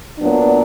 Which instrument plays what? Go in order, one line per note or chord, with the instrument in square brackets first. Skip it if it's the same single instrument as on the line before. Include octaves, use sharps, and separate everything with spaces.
[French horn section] A#2 F#3 B3 [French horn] D4